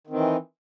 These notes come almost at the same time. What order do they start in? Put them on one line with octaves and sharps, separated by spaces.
D#3 C4 E3